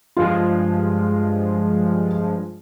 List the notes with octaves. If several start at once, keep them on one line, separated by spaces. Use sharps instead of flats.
G2 F3 G#3 F4